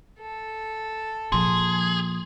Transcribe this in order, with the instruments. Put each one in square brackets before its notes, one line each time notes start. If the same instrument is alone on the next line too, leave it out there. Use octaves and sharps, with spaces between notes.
[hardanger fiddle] A4
[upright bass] A#2 F3 [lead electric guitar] G#4 [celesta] C6